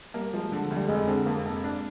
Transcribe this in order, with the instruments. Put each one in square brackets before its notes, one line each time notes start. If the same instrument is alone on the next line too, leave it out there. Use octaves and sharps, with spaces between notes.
[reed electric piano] G3 [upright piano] A#3
[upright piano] F3 [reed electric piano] G#3
[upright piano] D3
[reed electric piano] F3
[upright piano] D2
[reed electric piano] G3
[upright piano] F1 [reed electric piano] G#3
[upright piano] D3 [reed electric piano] C4
[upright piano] F2 [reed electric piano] A#3
[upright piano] F1
D4